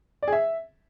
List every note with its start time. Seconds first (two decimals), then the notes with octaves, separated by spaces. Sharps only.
0.23 D5
0.28 G#4
0.33 E5